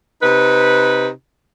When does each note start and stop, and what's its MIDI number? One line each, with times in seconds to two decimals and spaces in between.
0.22 1.08 48
0.22 1.08 63
0.22 1.08 71